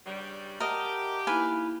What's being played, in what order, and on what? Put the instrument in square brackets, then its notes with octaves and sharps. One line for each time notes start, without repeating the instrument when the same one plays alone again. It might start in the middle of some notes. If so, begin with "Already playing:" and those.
[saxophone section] G2 C#3 G3
[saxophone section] G4 [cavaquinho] A#4 D#5 [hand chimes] E5 F#5 A5
[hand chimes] A#3 D#4 E4 [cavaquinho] B4 F5 G#5